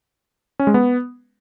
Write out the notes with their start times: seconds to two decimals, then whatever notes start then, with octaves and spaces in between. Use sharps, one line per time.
0.59 C#4
0.67 G#3
0.74 B3